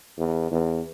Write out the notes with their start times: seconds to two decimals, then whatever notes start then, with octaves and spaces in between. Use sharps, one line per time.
0.18 E2
0.51 E2